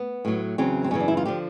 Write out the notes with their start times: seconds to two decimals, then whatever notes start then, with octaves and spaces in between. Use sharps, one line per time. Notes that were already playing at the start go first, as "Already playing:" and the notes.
Already playing: B3
0.25 A2 F#3
0.58 E2 C#3 F#3 C4
0.84 C4
0.91 F#2 C#3 E3 C#4
1.00 D4
1.08 E4
1.17 F4
1.25 D3 F3 G4